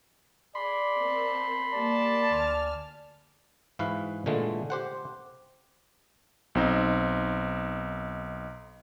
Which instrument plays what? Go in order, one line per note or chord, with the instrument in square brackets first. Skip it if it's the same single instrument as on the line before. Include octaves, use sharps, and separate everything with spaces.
[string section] G#4 [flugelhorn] D5 [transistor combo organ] B5 C6
[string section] C4 A#4 A5
[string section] G3 A#3 [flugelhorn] D5 [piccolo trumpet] A5
[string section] D2 G#5 F6
[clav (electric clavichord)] G#2 E3 F#4 B4 F5 F#5
A#2 D3 E3 G#3 A3
G4 C5 F#5
[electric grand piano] B1 C4 D#4